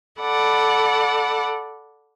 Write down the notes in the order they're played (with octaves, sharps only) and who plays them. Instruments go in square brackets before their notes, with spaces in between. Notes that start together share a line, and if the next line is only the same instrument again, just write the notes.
[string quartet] A4 D5 F#5 B5